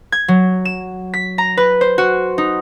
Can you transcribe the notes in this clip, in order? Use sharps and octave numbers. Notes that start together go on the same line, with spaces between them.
G#6
F#3
E7
B6
A#5
B4
C5
F#4
D#4